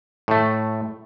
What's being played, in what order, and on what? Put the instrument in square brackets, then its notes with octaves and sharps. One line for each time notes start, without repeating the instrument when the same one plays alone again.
[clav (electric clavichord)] A2 A3